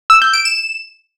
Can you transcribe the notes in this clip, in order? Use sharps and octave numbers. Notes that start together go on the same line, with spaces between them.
E6
G6
D7
E7